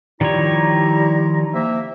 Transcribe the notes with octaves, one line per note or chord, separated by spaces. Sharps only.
D#3 F3 G3 E4 C#5 A#5
C3 A#3 E5